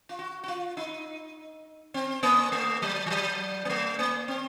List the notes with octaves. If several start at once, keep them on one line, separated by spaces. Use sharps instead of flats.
F4
F#4
F#4
F4
D#4
C4
A#3
A3
F#3
F3
F#3
A#3
A3
A#3
C4